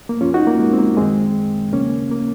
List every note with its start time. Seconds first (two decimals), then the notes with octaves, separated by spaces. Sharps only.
0.09 A#3
0.21 F#2 F3 C#4 F4
0.34 D#4 F#4
0.47 A#3
0.59 G#3
0.73 C4
0.78 A#3
0.97 F#2 D#3 G#3 C4
1.72 D#2 C#3 F3 A#3 C#4
2.11 A#3